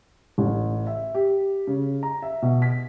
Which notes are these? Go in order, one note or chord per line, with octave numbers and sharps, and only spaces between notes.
A1
E5
G4
C#3
A#5
E5
B2
B6